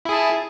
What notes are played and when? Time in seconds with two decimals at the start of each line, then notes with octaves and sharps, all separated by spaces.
0.05 E4
0.09 G#4
0.13 A5